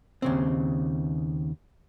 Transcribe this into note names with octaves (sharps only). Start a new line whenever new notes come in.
D#2 C#3 C4